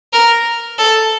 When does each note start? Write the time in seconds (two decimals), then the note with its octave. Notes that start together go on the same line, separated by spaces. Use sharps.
0.13 A#4
0.79 A4